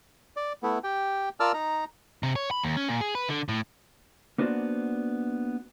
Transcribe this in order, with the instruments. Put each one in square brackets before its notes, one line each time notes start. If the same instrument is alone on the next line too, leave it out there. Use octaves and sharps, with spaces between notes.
[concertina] D5
A3 B3 E4
G4 G5
F4 A#4 D5 A5 E6 F6
D#4 A#5
[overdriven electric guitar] C3
C#5
B5
D#2
C#4
A#2
G#4
B4
D3
A2
[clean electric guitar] A#3 B3 D4 F#4 C5 D5